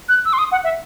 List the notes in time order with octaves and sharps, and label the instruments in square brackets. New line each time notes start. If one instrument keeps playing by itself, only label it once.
[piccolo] F#6
E6
C6
D#6
F#5
E5